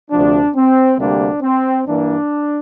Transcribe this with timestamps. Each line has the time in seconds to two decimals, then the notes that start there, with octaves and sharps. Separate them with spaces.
0.10 D2 C3 F3 D4
0.55 C4
0.99 D2 C3 G3 A#3 D4
1.42 C4
1.87 G2 E3 A#3 D4